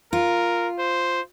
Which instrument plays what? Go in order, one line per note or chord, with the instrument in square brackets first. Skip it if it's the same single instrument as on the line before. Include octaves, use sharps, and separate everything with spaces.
[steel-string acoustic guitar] F4 [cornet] A#4
[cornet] C5